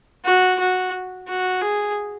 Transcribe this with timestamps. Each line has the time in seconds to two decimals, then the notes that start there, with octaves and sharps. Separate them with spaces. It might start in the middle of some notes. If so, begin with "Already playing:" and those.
0.25 F#4
0.60 F#4
1.28 F#4
1.62 G#4